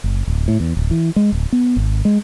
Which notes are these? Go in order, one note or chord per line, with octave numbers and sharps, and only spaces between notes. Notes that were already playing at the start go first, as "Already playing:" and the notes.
F#1
D1
A2
E2
D1
E3
G#3
D1
B3
G#1
G#3